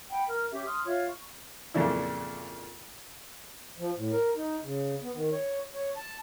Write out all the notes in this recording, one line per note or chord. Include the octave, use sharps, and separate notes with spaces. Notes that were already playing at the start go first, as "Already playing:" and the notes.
F#5 G5 B5
A#4 F6
C#4 G4 E5 D6
C6 D#6 F6
F4 C#5 E5
C#6
F2 A#2 C#3 F3 D4 E4
F3
A2
A#4
D#4
C#3
B3
D#3
C#5
C#5
A5